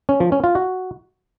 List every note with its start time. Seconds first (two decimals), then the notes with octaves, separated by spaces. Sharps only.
0.09 C#4
0.20 F3
0.32 C#4
0.44 F4
0.55 F#4